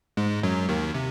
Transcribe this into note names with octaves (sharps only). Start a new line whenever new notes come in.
G#2 G#3
F#2 F#3
D#2 D#3
C3